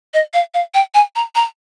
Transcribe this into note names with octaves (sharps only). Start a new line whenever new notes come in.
D#5
F5
F5
G5
G#5
A#5
A#5